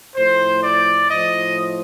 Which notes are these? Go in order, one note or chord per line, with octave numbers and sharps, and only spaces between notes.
A2 F3 C5
D5
A2 F3 D#5